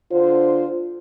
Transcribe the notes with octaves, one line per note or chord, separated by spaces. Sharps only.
D3 F4 C5